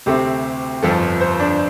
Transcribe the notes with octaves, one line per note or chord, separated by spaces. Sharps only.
D2 C3 A3 C4 G4
G1 F2 F3 A4
C5
D4